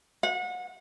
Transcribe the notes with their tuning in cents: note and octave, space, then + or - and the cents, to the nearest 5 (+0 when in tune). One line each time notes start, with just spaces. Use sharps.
F#5 -30